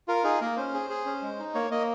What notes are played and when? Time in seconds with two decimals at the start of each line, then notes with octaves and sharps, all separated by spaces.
0.08 F4 A#4
0.24 D#4 G#4
0.41 A#3 A#4
0.57 C#4 C5
0.74 G#4
0.90 G#4
1.06 C#4
1.22 G#3
1.39 D#4
1.55 A#3 C#5
1.71 A#3 D#5